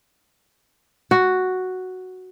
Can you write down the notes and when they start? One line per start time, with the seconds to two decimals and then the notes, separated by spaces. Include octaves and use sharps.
1.11 F#4